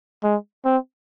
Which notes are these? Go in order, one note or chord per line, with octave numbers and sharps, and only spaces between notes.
G#3
C4